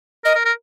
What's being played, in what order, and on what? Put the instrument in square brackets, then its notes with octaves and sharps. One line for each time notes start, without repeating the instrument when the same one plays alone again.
[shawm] A#4 [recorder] D#5
[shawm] A#4
A#4